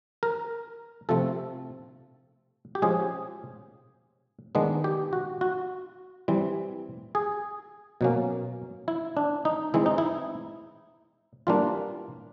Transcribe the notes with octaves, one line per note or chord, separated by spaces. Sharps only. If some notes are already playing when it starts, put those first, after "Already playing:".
A#4
C3 F3 A3 C4 A4
G4
F3 G#3 C#4 G#4
D#3 G#3 B3 D4
G4
F#4
F#4
E3 G3 C4
G#4
B2 F#3 A#3 C#4
E4
D4
D#4
E3 G#3 C4 E4
D#4
E4
E3 G3 A#3 D4 F4